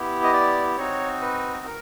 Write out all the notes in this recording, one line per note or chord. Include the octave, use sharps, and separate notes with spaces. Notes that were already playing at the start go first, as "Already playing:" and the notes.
Already playing: B3 E4 G4
D#5
D5
C4 D#4 F#4 C#5
B4
A#4